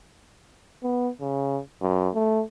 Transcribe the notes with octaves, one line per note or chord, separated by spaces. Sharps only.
B3
C#3
F#2
A3